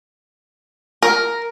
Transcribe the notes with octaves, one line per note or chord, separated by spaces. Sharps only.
A#4